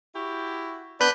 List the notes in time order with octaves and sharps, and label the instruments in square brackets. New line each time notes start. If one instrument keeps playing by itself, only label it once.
[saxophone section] E4 F#4 G4
[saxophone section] B3 D4 [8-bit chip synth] B4 F#6 G6